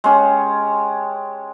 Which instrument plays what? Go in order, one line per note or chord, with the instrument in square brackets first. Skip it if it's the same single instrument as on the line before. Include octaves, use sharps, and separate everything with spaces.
[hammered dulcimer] G#3 C#4 G4